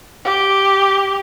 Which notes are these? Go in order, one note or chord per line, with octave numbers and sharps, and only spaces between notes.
G4